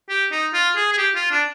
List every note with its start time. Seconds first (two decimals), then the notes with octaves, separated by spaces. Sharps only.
0.09 G4
0.32 D#4
0.54 F4
0.76 G#4
0.93 G#4
0.98 G4
1.15 F4
1.31 D4